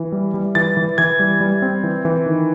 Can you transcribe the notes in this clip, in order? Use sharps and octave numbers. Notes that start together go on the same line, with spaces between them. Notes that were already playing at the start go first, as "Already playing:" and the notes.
Already playing: E3
G3
G3
E3 A6
E3
E3 G#6
G3
G3
C4
E3
E3
D#3